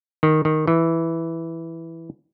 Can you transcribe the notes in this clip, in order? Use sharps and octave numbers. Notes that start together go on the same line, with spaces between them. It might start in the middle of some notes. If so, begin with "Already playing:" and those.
D#3
D#3
E3